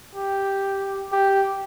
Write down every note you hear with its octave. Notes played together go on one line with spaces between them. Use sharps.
G4
G4